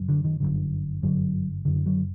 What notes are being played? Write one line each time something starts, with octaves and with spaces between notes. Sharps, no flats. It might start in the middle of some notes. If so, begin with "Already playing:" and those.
Already playing: F#1 F#2
D3
D#3
G1 F#2 D3
G1 F#2 D3 F#3
F#1 F#2 D3
F#3